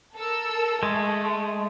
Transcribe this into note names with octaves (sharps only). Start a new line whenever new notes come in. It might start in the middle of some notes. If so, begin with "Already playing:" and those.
A4 A#4 E6
G#3 A3